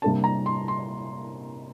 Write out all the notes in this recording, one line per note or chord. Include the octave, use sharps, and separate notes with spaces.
C3 G3 A#3 D4 A5
A#5
C6
C6